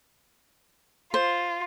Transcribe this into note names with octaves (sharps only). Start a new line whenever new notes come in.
F4 C5